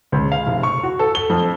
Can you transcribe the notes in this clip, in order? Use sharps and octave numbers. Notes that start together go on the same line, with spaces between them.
C#2
F5
F1
C#6
F#4
A4
G7
F2